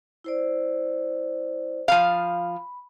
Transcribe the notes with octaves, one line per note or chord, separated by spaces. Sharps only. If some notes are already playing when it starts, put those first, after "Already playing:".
E4 C5 D5
F3 F5 B5